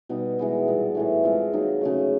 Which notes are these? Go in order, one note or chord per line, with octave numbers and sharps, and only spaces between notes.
B2 G3 B3 D#4
E3 G#3 B3
A#2 G3 B3
A2 E3 A3
G#3 C4 F4
D#3 F#3 A#3 D#4
C#3 F#3 A3